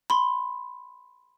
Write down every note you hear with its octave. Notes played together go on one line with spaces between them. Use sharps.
B5 C6